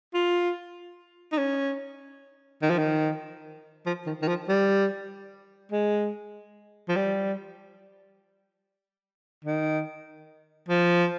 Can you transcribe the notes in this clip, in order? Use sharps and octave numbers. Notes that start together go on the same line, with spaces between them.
F4
D#4
C#4
D#3
F3
D#3
F3
D#3
D#3
F3
G3
G#3
F3
G3
D#3
F3